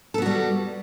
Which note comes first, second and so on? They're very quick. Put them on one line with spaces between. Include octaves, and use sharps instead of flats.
A4 B3 F#4 G3